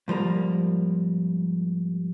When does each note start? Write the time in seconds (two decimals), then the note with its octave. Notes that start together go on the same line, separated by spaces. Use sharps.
0.08 G#2 F3 G3 A#3